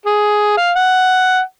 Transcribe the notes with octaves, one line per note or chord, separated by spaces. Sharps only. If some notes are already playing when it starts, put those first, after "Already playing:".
G#4
F5
F#5